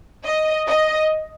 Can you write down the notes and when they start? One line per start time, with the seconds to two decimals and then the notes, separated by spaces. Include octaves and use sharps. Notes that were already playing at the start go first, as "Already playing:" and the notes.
0.25 D#5
0.67 D#5